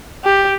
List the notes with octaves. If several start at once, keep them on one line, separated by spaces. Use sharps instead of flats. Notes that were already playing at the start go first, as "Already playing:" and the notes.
G4